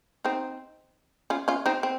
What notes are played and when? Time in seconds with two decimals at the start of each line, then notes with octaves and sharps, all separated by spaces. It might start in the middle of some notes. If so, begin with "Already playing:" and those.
0.25 C4 D#4
1.30 C#4 F4
1.48 C#4 F4
1.66 C4 D#4
1.83 C4